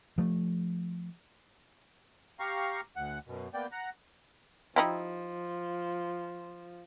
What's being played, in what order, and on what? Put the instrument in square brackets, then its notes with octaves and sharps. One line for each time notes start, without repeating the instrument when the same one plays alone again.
[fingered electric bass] F3 A3
[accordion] G4 F5 A#5 C#6
D2 F#5
F#2 B2
A#3 B3 D5 G5
F#5 A#5
[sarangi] F3 [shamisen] D#4 E4 G4